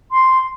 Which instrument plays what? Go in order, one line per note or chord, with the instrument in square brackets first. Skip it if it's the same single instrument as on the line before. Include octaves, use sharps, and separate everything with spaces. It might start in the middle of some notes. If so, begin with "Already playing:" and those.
[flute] C6